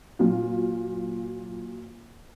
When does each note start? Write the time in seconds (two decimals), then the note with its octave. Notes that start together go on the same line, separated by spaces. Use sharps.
0.19 A#2 F#3 F4